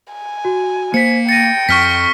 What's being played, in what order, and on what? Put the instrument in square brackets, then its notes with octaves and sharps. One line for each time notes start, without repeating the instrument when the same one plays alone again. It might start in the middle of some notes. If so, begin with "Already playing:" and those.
[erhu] G#5
[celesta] F#4
[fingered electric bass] A#3 [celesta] C5 B6 [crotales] C#7
[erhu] G5 [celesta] A6 A#6 D#7 [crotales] C#7
[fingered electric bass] F2 [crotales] C#6 F6 B6